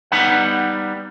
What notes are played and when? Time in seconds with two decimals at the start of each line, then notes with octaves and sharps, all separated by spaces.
0.12 G3 B3 D#4 B4 F#5